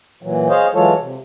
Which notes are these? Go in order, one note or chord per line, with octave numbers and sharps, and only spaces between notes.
A#2 E3 F#3
G#4 C5 C#5 D#5 F5
E3 F#3 G#3 F4 A4 C#5
C3